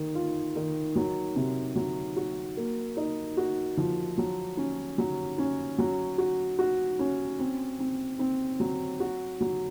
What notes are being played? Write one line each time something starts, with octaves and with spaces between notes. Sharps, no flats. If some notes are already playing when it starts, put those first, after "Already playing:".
Already playing: D#3
F4
D#3
F#3
C3
F#3
F#4
A#3
D#4
F#4
F3
F#3
C#4
F#3
C#4
F#3
F#4
F#4
C#4
C4
C4
C4
F#3
F#4
F#3